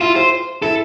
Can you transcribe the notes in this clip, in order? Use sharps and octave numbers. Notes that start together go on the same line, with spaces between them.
E4 F4
C5
E4 A4